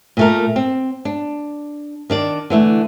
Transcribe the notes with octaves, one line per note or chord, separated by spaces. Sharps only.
A#2 A3 A#4
C4
D4
D#3 D4 D5
D3 E3 A3